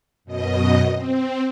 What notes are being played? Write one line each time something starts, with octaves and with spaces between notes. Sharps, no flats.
F#2 B2 D#5
C4